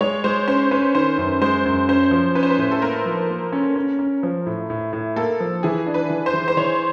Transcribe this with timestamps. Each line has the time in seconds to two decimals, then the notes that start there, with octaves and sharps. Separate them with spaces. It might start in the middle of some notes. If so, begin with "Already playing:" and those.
0.01 G#3 C#5
0.24 G#3 C5
0.48 C#4 C5
0.71 C#4 B4
0.95 D#3 C5
1.18 F#2
1.41 G#3 C5
1.65 F#2
1.88 C#4 C5
2.11 F3
2.35 C#4 B4
2.43 C5
2.50 B4
2.58 A2
2.71 A4
2.82 A#3 A#4
3.05 F3
3.30 A#3
3.53 C#4
3.76 C#4
3.99 C#4
4.23 F3
4.46 A2
4.70 A2
4.93 A2
5.16 A#3 A4
5.40 F3
5.63 E3 G#4
5.86 D4
5.94 B4
6.10 E3
6.26 C5
6.34 E3
6.48 C5
6.57 E3 C#5